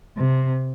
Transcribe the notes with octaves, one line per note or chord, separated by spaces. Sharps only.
C3